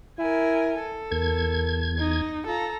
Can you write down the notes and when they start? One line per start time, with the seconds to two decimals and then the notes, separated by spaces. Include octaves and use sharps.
0.19 E4 A#4 G#5
0.79 A4
1.11 E2 A#4 G#6
1.99 D#4
2.47 F4 A4 A#5